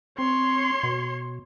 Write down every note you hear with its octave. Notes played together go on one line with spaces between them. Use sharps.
C4 C#5 C6
B2